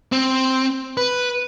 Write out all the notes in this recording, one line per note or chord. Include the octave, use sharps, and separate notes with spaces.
C4
B4